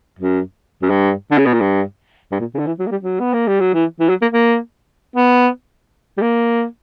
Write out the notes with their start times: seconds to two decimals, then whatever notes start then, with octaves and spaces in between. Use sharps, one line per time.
0.19 F#2
0.82 F#2
0.90 G2
1.31 D3
1.38 C#3
1.46 B2
1.53 A#2
1.60 G2
2.32 G2
2.40 A#2
2.55 C#3
2.59 D3
2.67 E3
2.79 F#3
2.87 A#3
2.91 G3
3.03 F#3
3.20 B3
3.34 A#3
3.48 G3
3.60 F#3
3.74 E3
4.00 E3
4.09 F#3
4.22 A#3
4.33 A#3
5.16 B3
6.18 G3
6.22 A#3